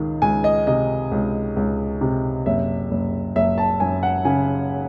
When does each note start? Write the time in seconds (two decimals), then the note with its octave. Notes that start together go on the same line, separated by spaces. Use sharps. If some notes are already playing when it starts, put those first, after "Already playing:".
Already playing: C#2 D#3
0.22 C#2 G#5
0.44 D#5
0.67 C3 D#5
1.12 C#2
1.56 C#2
2.01 C3
2.46 F#1 E5
2.91 F#1
3.35 F#1 E5
3.58 A5
3.80 F#2 G#5
4.03 F#5
4.25 C#3 G#5